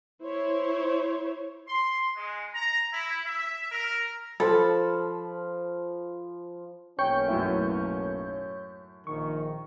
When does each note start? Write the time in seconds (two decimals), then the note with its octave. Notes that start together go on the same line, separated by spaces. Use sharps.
0.21 E4 C5 C#5
1.68 C6
2.15 G#3
2.53 A#5
2.93 E4
3.26 E5
3.72 A#4
4.40 F3 A4 B5
6.99 B1 A#3 C#4 C#5 G5 C#6 G6
7.28 F#2 A2 E4
9.07 A#1 D#3 C#6